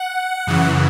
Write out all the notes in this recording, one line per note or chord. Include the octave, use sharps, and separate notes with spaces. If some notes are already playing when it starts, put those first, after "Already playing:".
Already playing: F#5
F#2 C#3 E3